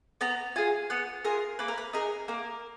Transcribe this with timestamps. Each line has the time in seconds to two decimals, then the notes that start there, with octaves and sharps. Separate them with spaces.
0.21 B3 A#5
0.56 F4 G#4 G#5
0.90 B3 F#5
1.24 F4 G#4 A#4
1.59 A#3 B4
1.68 A#4
1.78 B4
1.93 D#4 G#4 A#4
2.28 A#3 A#4